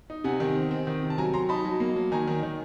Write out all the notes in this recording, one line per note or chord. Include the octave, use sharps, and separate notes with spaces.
D#4
C3 F#5 G#5
D#3
C4
C4
D#3
C3
A5
F#3 G#5 A#5
F#3 A#5 C6
D#4 A5 B5
F#3
A#3
F#3
D#3 G#5 A#5
D#3
D#3